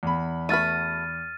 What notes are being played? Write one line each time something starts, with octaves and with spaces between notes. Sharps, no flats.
E2 B5
A3 F#4 B4 F6 A6 D#7